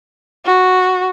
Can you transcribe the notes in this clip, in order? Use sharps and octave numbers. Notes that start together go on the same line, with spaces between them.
F#4